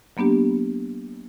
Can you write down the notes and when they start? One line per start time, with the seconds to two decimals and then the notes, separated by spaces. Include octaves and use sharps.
0.17 F#3 A#3 B3 D4 G4